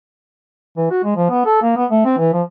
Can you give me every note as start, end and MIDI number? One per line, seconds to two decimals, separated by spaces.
0.77 0.86 52
0.91 1.00 66
1.04 1.16 56
1.16 1.29 53
1.30 1.42 59
1.46 1.57 69
1.62 1.72 58
1.76 1.86 59
1.91 2.01 57
2.05 2.14 60
2.18 2.31 52
2.33 2.42 53